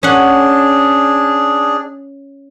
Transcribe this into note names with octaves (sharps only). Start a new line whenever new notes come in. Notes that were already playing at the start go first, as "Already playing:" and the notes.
C#4 D4 G#4 F#5